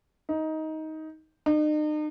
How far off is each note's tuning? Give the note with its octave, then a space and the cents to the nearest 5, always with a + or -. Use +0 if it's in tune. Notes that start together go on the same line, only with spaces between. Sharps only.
D#4 +15
D#4 -40